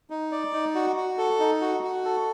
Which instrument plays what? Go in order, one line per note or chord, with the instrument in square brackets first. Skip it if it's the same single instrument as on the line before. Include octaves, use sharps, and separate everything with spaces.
[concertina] D#4
D5
D#4
F#4
F#4
A4
D#4
F#4
F#4
A4